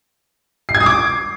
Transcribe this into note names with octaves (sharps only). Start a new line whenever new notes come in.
C7
G#6
D#6
D6